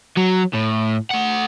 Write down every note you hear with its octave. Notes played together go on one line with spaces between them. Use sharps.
F#3
A2
A3 F#5